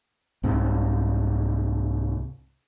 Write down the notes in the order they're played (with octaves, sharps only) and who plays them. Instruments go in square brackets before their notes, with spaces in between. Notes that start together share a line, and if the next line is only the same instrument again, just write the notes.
[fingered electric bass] C2 G#2 C3